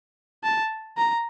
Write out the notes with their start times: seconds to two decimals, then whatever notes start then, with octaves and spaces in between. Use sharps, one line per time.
0.44 A5
0.98 A#5